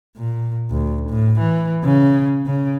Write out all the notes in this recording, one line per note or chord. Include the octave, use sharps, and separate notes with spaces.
A#2
D2
A2
E3
C#3
C#3